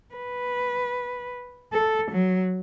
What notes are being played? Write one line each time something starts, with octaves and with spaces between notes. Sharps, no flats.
B4
A4
F#3